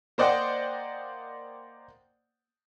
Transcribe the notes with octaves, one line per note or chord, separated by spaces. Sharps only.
A#3 C5 D5 D#5 F#5 G5